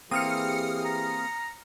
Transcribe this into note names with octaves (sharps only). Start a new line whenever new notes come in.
E3 A#3 C4 G4 G#4 D#6 F6 C#7
A#5